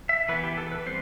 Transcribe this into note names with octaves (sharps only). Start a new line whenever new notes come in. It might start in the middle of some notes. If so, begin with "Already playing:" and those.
E5
E3 B3 B4
G4
A4
B4
E3 G3 C4 C5